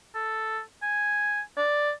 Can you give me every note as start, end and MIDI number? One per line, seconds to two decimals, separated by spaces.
0.15 0.60 69
0.83 1.40 80
1.57 1.92 74